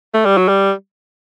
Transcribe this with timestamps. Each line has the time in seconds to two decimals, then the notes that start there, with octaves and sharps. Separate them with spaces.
0.14 A3
0.25 G3
0.37 F#3
0.49 G3